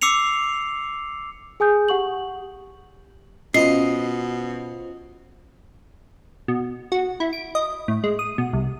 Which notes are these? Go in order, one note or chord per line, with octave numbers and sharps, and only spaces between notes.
D6 E6 C7 C#7 F7
G#4 G#5 D#6 G6
G4 F#5 C#6 F#7
B2 C#4 F4 C5 D#5 C7
B2
F#4
E4
D7
D#5
A2
G#3
D#6
B2
C2